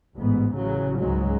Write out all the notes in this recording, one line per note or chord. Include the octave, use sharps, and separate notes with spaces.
A1 G#2 B3
A1 C#3 F#3
C#2 G#2 C#3 F#3 G#3